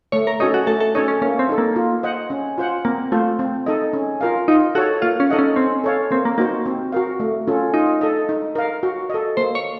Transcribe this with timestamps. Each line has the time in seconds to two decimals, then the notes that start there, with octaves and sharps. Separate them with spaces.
0.12 A3 C#5
0.27 A#4
0.40 C#4 D#4 F#4 A4 C#5
0.54 F#4
0.67 A3 A4
0.80 A4
0.95 C#4 D#4 A4 C#5
1.08 C#4
1.22 A#3 C#4
1.39 C4
1.49 D#4 A4
1.58 A#3
1.76 F4
2.03 C5 D#5 F#5
2.30 C#4
2.58 F4 C5 F#5
2.85 A#3 C4
3.12 A3 F4 C5
3.39 C4
3.66 D#4 A4 D#5
3.93 C#4
4.21 F4 A#4 F5
4.48 D#4 F4
4.75 F#4 A4 C#5
5.02 A#3 F4
5.20 C#4
5.30 D#4 A4 D#5 F#5
5.39 C#4
5.56 C4 C#4
5.84 A4 C#5 F5
6.11 A#3 C4
6.25 A#3
6.38 A#3 D#4 F#4 C5
6.66 C4
6.92 F#4 A#4 F5
7.20 A3
7.47 C#4 F4 A4
7.74 D#4 F4
8.01 A4 D#5
8.29 D#4
8.55 A#4 F5
8.83 F#4
9.10 A4 D#5
9.37 A#3 C5
9.55 C#5